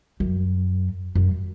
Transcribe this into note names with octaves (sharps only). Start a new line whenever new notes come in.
F#2
F#2